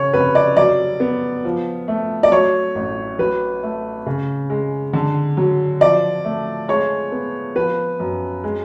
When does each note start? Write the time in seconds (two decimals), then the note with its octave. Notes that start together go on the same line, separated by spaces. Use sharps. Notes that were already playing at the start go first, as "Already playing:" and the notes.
Already playing: C#3 C#5
0.13 F1 B4
0.35 D5
0.57 F#3 D5
1.00 B3
1.45 F3
1.88 A3
2.23 D5
2.31 F#3 C#5
2.75 A1
3.19 F#3 B4
3.63 A3
4.06 C#3
4.50 G#3
4.93 D3
5.37 F#3
5.80 F3 D5
6.25 A3
6.68 G#3 C#5
7.12 B3
7.56 F3 B4
8.00 F#2
8.44 G#3